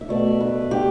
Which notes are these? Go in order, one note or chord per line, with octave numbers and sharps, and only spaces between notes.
E5
B2 A3 D5
B4
G4